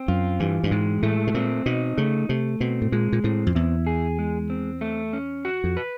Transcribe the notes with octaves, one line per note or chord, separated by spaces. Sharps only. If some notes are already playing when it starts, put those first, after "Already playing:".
Already playing: C4
F#2 F4
G2 E3
G2
G#2 G#3
A2 A3
B2
A#2 C4
B2 D#4
C#3 A3
C3 A3
B2 C4
A2
A#2 G#3
A#2
A2 C4
F2
E2 E4
G#4
G#3
C4
A3
C#4
F#4
F2
B4